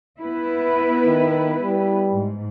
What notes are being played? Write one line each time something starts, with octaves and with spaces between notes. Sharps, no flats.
B3 E4 B4
D#3
G3
G#2